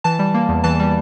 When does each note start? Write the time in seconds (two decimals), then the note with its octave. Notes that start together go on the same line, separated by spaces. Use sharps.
0.04 E3 A5
0.19 G3
0.34 A#3
0.49 E2
0.64 E3 A5
0.79 G3